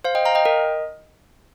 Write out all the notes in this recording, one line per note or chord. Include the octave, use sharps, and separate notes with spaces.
C5 F5
D#5 G5
F5 A#5
D#5 G5
A#4 D#5